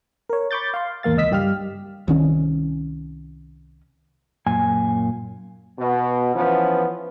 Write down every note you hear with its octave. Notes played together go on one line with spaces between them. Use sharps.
A#4 C#5
B5 C#6 D6 G6 A6
F5 C6
G#1 E2 A#3 F5 A6
C#2 D#5 E6 B6
G2 G3 G4 F5 F6
C2 D#3 C#4
F#2 A#2 G#5
B2
E3 F3 B3 C#4